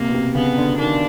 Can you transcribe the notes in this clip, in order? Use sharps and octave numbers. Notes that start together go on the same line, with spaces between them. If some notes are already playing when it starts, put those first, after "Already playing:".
Already playing: C3 A#3
B2
C3
C#3 B3
D3
D#3 D4